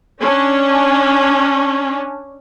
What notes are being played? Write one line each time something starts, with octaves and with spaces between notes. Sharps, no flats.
C#4 D4